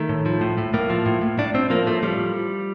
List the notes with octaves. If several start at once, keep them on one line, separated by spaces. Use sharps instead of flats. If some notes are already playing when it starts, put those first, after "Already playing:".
Already playing: D#3 A3
A2
F3
A2
A2
A2 A#3
F3
A2
A2
A2 D4
A2 C4
F3 A#3
A2 A3
F3 G3